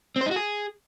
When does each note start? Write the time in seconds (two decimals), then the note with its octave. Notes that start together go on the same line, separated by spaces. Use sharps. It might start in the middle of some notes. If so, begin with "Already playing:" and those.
0.16 C4
0.21 C5
0.26 D#4
0.31 F#4
0.36 G#4